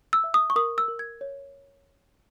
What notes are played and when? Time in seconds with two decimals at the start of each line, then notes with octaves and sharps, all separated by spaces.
0.13 E6
0.24 E5
0.34 D#6
0.50 C#6
0.56 A#4 D#6
0.78 E6
0.88 A#4
0.99 G#6
1.21 C#5